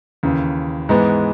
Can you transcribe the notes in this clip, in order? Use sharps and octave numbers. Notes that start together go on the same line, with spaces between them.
D#2 C#3 E3
G#2 E3 G#3 B3